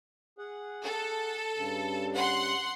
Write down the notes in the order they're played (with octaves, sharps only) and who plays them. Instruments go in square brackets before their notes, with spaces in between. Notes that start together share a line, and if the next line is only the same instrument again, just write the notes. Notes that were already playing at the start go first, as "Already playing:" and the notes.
[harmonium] G#4 F#5
[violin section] A4
[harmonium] G2 C#3
[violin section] F#5 C6